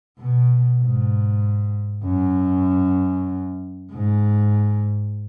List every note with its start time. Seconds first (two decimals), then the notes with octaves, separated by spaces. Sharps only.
0.19 B2
0.81 G#2
2.04 F#2
3.91 G#2